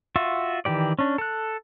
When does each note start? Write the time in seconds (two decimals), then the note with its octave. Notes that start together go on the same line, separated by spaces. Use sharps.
0.16 F4 F#4 E5
0.65 D#3 E3 G4 D5
0.99 C#4 D4
1.18 A4 F#6